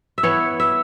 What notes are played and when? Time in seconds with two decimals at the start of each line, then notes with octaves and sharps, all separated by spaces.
0.18 E5
0.23 E3 B3 C#5
0.60 E5